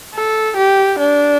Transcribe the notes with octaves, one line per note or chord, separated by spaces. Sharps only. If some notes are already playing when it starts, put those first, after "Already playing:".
A4
G4
D4